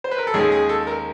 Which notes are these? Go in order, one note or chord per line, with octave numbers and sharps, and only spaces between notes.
C5
B4
A#4
A4
D#2 D#3 G#3 C#4 G#4
G#4
A4
A#4